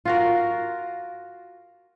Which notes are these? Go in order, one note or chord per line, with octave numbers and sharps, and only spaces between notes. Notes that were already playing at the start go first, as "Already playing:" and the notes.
F4 F#4 A#4